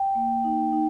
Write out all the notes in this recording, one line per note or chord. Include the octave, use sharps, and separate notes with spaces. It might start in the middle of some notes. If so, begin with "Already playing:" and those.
Already playing: G5
A#3
D#4
D#4